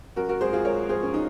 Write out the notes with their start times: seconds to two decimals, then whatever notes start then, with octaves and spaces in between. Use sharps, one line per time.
0.16 F#2 F#4 A#4
0.29 F#4 A#4
0.41 G#1 G#4 C5
0.53 F4 G#4
0.65 G#1 A#4 C#5
0.89 F3 G#4 C5
1.03 C#4
1.14 D#4